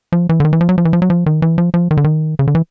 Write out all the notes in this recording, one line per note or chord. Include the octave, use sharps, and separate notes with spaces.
F3
E3
D3
D#3
E3
F3
F#3
F3
E3
F3
F#3
F3
D#3
E3
F3
F3
D#3
D3
D#3
C#3
D3
E3